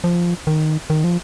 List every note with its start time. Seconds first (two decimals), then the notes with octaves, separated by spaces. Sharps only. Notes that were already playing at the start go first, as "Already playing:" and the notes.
0.04 F3
0.47 D#3
0.90 D#3
1.04 F3